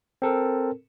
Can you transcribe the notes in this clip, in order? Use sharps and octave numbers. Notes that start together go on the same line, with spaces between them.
C4 A4 A#4